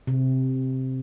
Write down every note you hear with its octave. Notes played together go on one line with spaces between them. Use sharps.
C3